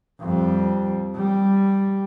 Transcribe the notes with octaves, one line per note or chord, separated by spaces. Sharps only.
F2 G3
G3